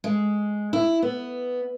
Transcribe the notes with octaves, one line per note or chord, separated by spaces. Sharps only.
G#3
E4
B3